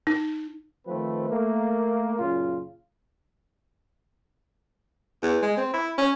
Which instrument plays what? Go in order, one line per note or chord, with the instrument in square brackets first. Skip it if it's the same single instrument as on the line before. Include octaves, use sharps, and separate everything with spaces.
[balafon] D#4
[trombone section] D#3 F3 A3 C4 B4
A3 A#3
F#2 A#2 C#3 F4
[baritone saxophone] E2
G#3
C4
E4
C#4